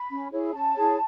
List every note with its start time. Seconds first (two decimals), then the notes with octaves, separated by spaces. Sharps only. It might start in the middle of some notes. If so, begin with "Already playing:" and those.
Already playing: B5
0.10 C#4
0.31 E4 G#4 C#5
0.53 C#4 A5
0.75 E4 G#4 C#5